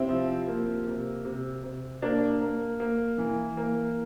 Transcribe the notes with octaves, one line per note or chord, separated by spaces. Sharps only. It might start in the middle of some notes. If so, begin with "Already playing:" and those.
Already playing: C3 C4 E4
F3
A#3
C3
C3
C3
A#3 D4
A#3
A#3
E3
A#3